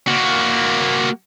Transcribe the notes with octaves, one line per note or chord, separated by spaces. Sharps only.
A#3 F#4